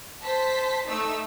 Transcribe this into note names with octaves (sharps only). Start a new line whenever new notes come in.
C5 A5 B6
A3 D#4 E6